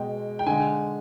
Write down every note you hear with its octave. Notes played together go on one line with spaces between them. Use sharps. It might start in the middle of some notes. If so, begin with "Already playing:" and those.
Already playing: B2 G#3 G5
G5
D3 G#3 G#5